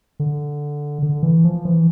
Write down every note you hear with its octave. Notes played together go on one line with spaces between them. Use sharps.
D3
D3
E3
F3
E3